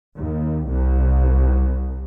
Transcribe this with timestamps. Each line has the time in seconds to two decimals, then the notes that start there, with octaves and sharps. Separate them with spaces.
0.16 D#2
0.67 C2